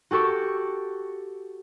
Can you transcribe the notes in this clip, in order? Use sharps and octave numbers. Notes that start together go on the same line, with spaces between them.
F#4 G4 A4 C#6